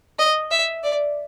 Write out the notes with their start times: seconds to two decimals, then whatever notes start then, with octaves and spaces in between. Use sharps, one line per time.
0.19 D#5
0.51 E5
0.83 D5